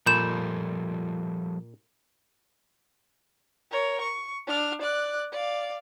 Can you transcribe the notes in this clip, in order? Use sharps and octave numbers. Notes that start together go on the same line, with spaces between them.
A#2 F3 G3 A4 B5 G6 E7
A#4 C#5
C#6
D4 F6
D5 F#6
D5 F5